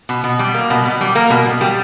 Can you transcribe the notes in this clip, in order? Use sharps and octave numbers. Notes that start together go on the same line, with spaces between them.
B2
B2
G3
A#3
B2
B2
G3
A#3
B2
B2
G3